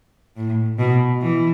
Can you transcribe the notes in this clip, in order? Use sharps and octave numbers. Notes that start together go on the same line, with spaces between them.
A2
B2
E3